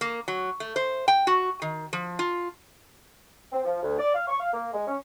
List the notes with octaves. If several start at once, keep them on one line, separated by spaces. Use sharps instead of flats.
A#3
F#3
A3
C5
G5
F#4
D#3
F3
F4
C4
F3
D2
D5
F5
C#6
F5
A#3
G#3
C#4